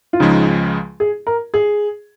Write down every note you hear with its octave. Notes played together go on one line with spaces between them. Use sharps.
F4
C#2 C#3 F3 G#3 D#4
G#4
A#4
G#4